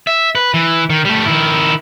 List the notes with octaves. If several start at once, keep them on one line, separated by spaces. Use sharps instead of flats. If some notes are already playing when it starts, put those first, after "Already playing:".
E5
B4
E3
D#3
G3 A3
D#3 E4